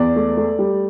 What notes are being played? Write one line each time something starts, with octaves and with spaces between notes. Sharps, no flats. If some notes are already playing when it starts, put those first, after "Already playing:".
Already playing: E2 D5
A3
A3
G3